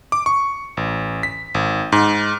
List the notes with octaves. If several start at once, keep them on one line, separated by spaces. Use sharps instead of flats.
D6
C#6
A1
B6
G#1
G#2